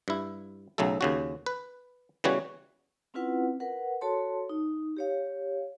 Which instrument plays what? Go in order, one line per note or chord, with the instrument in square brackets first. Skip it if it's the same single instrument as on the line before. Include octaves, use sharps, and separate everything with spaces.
[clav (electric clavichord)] G2 E4
B1 C#3 F#3 A3 A4
D#2 C#3 F#4
B4
C#3 E3 G3 B3 F#4 C#5
[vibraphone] C4 C#4 E4 F4 B4 F#5
A#4 B4 F#5
F#4 A4 C#5 A5 C6
D#4
G4 C#5 F5